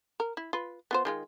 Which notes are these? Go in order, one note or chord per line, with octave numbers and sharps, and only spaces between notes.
A#4
E4
F4 B4
B3 F4 C5
D#3 G#3 F4